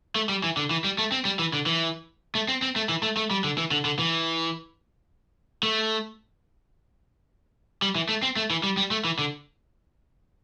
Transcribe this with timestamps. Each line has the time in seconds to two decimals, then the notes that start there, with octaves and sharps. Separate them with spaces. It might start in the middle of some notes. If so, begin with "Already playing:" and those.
0.16 A3
0.29 G3
0.44 E3
0.57 D3
0.71 E3
0.84 G3
0.98 A3
1.12 C4
1.25 G3
1.39 E3
1.53 D3
1.66 E3
2.35 A3
2.49 C4
2.62 C4
2.76 A3
2.89 E3
3.03 A3
3.17 A3
3.31 G3
3.44 D3
3.58 E3
3.71 D3
3.85 D3
3.99 E3
5.63 A3
7.82 G3
7.95 E3
8.09 A3
8.22 C4
8.36 A3
8.50 E3
8.64 G3
8.77 G3
8.91 A3
9.05 E3
9.19 D3